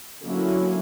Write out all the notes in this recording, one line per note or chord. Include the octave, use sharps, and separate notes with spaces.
D3 F#3 A#3 C#4 E4